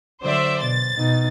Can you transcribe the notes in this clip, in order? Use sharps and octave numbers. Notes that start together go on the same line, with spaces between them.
D3 F#3 C5 D5 E5
B2 A6
B2 D#4